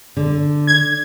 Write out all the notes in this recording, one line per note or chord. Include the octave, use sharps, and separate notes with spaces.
D3
G#6